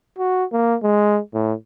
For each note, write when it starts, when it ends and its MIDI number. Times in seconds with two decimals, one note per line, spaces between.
0.18 0.44 66
0.52 0.75 58
0.83 1.20 56
1.34 1.53 45